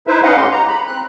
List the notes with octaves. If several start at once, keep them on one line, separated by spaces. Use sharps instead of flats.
D#4 E4 B4 C5 E5
C#4 B4 D#5 F5 F#5
G#2 A3 G4 C6
A#5
B5
C4 F#6